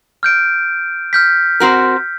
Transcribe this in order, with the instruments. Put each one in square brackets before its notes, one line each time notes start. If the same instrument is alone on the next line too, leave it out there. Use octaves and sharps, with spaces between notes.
[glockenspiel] F6 G6 D7
F6 G6 B6
[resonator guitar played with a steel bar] C4 F#4 A#4